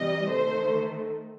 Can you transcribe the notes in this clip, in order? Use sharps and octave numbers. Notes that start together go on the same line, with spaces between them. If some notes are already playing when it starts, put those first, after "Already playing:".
Already playing: C3 E3 G3 D#5
D#3 A3 C5